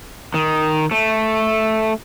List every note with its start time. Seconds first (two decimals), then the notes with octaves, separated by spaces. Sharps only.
0.34 D#3
0.91 A3